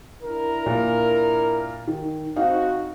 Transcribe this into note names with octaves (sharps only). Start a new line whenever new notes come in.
D4 E4 A#4
A#2
D#3
C4 D#4 F#4 D#5 F5